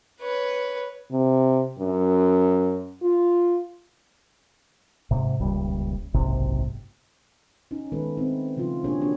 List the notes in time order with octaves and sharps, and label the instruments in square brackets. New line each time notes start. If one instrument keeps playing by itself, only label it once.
[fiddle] B4 C#5
[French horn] C3
F#2
F4
[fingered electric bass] G#2 C3
D#1 C#2 G3
F#1 B1 G#2 C3
[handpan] C#4 D#4
D#3 G#3 A3 B3 A4 B4
A3 C4 D#4
C#3 F3 D#4 F4
B2 A#3 D4 G4 G#4 C#5
E3 A#3 D4 F#4 G4 C#5